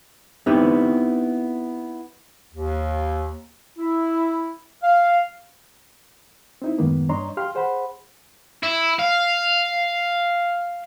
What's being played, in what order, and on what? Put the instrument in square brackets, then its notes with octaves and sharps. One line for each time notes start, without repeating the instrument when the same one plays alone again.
[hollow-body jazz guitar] B3 C4 D#4 E4 G4 B4
[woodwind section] D#2
E4
F5
[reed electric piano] C4 D#4 E4
F#2 A2 D#3 G#3 A#3 B3
G2 D4 C#5 D#5 A#5 C6
G4 F5 C6 F6
G#4 C5 F#5 B5
[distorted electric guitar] E4
F5